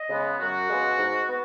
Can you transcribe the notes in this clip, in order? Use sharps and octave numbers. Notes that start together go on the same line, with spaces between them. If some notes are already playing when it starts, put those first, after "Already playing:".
Already playing: D#5
C#3 G#3 B3
F#2 F#4
C#3 G#3 B3
G#2
B3